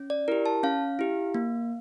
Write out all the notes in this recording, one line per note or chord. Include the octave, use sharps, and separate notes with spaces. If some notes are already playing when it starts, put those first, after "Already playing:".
Already playing: C#4
D5
E4 G4 A#4
A5
C#4 F5
E4 G4
A#3